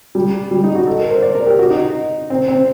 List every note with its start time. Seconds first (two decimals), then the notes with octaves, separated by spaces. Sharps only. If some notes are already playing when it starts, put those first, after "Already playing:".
0.15 G3
0.51 G3
0.64 D#4
0.75 F#4
0.87 A4
0.99 A#4
1.10 C5
1.22 D5
1.34 A#4
1.47 G4
1.59 F#4
1.70 D#4
2.30 C4
2.48 C4